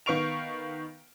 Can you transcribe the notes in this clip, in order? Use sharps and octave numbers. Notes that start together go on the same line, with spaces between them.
D#3 B3 F5 C#6 D7 F7